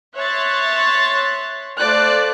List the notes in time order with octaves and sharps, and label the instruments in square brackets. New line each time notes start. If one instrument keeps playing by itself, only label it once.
[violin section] C#5 E5 C6 F#6 A6
A3 F4 C5 D5 F#6